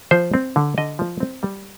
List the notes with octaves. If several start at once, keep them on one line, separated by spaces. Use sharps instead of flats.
F3 C5
C4
D3
D3 D#5
F3
C4
G3